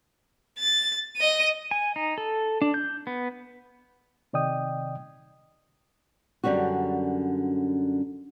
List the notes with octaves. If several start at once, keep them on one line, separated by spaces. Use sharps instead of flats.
A6
D#5 D#7
G#5
D#4
A4
D4
G6
B3
C3 D#3 D5 D#5 G5 D#6
F#2 D3 G3 C#4 F#4